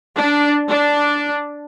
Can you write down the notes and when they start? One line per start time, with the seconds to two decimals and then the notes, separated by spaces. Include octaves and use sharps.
0.16 D4
0.68 D4